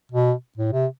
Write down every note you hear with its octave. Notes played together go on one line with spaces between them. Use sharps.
B2
A2
C3